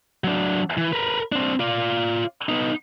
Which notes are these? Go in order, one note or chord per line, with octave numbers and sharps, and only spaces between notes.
F#3 D4
E3
A#4 B4
C4 D4
F4 D5
B3 D#4